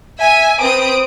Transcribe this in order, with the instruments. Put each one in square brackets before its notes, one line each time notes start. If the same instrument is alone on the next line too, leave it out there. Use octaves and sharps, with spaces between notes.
[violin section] E5 G#5
C4 B4 D#6 D7